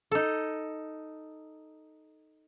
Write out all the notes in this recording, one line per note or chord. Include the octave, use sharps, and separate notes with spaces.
D#4 A4